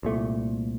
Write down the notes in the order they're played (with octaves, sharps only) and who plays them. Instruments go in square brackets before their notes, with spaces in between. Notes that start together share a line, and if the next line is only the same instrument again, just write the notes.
[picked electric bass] C2 A#2 A3